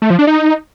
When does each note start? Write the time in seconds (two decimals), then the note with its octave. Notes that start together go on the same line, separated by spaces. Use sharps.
0.02 A3
0.10 F3
0.19 D4
0.27 D#4